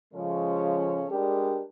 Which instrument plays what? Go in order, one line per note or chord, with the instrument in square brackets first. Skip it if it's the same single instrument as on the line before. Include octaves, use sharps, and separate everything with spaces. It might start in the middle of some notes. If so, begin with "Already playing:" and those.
[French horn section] C#3 F3 G#3 C#4 A4
G3 G#3 D4 G4 A#4